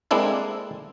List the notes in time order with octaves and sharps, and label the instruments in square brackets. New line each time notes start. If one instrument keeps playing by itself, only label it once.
[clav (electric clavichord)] G#3 A#3 C4 D4 E4 A4